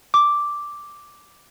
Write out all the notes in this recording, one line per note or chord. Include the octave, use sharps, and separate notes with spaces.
D6